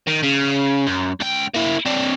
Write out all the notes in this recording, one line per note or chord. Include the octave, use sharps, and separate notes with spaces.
D#3
C#3
F#2
C#2 G5
A#3 E4
C4 D4